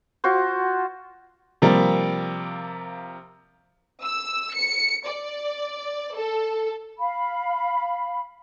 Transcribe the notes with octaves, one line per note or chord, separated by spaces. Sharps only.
F4 F#4 C5
C3 F3 G3 A#3
E6
C#7
D5
A4
F5 B5